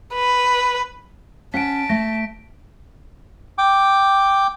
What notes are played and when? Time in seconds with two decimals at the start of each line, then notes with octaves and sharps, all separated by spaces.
0.14 B4
1.54 C#4 F#5 A5 B6 D7
1.89 A3 A#6
3.58 G5 D6